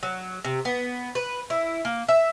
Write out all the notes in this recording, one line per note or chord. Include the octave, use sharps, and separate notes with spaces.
F#3
C3
B3
B4
E4
A#3
E5